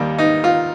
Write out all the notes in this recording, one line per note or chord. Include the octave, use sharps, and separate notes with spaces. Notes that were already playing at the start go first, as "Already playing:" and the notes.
Already playing: D#2 D#3 G3 A#3
D#4
F4